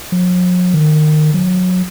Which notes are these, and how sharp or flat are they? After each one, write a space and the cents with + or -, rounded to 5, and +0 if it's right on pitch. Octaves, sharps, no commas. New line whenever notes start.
F#3 -45
D#3 -25
F#3 -20